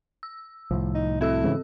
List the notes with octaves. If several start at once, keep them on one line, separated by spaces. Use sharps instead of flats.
E6
C2 A2 F3
D#4
C4 E4 A4 E6
G#2 C#3 E3